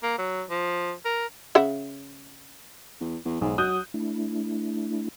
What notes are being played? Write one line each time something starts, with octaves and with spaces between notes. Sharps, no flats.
A#3
F#3
F3
A#4
C#3 E5 F#5
E2
E2
B1 G#2
F#3 D#6 F#6 G6
A3 D4 E4